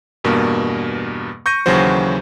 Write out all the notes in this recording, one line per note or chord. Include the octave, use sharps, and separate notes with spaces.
E2 G2 B2 A#3
C#6 G6 A#6 C#7 D#7
D#2 C#3 E3 F#3 F#4 C5